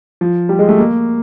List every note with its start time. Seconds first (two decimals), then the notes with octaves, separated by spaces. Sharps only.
0.21 F3
0.49 G3
0.59 G#3
0.69 A3
0.78 A#3